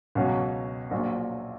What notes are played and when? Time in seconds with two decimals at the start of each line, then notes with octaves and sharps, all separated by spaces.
0.15 C#2 B2 F#3 C#4
0.91 A#1 A#2 F#3